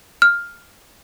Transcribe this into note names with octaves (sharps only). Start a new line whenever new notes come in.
F6